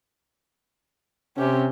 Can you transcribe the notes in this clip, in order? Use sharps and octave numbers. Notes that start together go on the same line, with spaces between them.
C3 C#4 G4